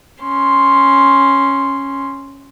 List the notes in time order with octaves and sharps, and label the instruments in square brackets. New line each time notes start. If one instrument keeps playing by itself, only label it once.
[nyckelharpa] C#4 C6